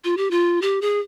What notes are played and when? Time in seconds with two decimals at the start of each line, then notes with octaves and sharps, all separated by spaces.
0.04 F4
0.17 G4
0.31 F4
0.62 G4
0.82 G#4